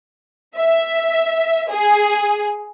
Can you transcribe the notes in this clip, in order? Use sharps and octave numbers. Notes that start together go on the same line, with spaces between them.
E5
G#4